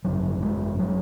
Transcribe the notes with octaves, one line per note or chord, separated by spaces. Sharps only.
G#1 F#2 C#3 F#3
G#3
F#3